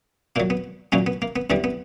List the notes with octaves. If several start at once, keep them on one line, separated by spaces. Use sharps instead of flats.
A#2 F#3 A#3
B3
A#2 F#3 A#3 C#4
B3
A#3
B3
E2 D3 G3 B3
B3